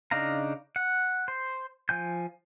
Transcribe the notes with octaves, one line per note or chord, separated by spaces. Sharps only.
C#3 D4 D#4 F5 A#5
F#5
C5
F3 G#5 G6